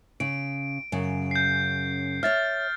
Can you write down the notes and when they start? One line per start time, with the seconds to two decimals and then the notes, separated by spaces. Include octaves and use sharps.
0.20 C#3 D7
0.92 F#2 C#3
1.31 G6 C7
2.23 C#5 E5 F6 A6